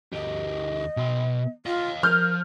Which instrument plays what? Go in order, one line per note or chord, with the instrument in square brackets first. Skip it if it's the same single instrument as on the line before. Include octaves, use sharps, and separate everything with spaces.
[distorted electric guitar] D2 G4 [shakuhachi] D#5
[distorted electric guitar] B2 C6
[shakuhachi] F4 [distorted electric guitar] D#5 F5
[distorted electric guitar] F3 [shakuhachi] A#4 [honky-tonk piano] F6 G6